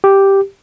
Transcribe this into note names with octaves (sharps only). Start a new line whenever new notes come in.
G4